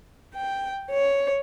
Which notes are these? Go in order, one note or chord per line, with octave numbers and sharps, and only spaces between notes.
G5
C#5